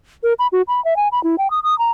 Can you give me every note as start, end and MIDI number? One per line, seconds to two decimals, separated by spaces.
0.23 0.33 70
0.39 0.47 83
0.52 0.62 66
0.68 0.83 83
0.85 0.96 76
0.97 1.08 80
1.12 1.22 83
1.24 1.36 64
1.38 1.50 79
1.51 1.60 87
1.63 1.77 87
1.79 1.92 82